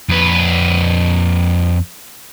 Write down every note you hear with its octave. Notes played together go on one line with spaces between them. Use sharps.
F2 B4